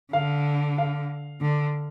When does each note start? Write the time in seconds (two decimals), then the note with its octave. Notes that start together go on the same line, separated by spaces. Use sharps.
0.13 D3 F5
0.78 F5
1.42 D3